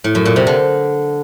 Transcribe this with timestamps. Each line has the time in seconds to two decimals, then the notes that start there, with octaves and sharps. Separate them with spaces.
0.04 A2
0.15 F#2
0.25 A#2
0.36 C3
0.47 D3